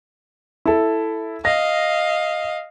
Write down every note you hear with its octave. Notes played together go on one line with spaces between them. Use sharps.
E4 A4
D#5 F5 A#6